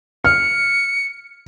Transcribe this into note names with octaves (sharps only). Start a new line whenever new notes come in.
F6 C#7